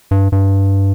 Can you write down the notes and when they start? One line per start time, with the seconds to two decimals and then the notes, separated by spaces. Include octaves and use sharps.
0.11 G2
0.32 G2